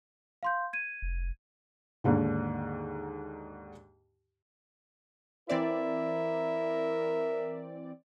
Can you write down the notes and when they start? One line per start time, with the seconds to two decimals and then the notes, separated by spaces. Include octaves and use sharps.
0.43 F5 C6 G6
0.73 G#6 D#7
1.02 F1
2.04 D#2 G#2 D3 D#3
5.49 E3 C4 E4 A#4 D5 E5